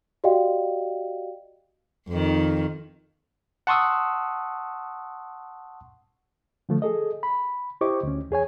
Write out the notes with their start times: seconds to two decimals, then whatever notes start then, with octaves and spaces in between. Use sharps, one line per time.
0.24 F#4 G4 D5 D#5 F5 G5
2.09 F2 D#3
3.67 F#5 A5 C6 C#6 D#6 E6
6.69 D3 F3 A3
6.82 G#4 A4 D#5
7.23 B5
7.81 E4 G4 C5 D#5 C#6 D6
8.03 D2 C#4
8.31 E2 G#4 C#5 G#5